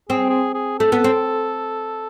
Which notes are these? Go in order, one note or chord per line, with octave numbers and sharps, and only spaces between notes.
C4 G#4
G#4
G#4
A3 A4
B3
C4